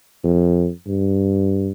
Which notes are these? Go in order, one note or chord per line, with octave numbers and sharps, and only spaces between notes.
F2
G2